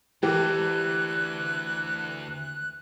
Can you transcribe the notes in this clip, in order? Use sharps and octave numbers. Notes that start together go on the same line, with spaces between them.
D2 E3 G4 A#4 F#6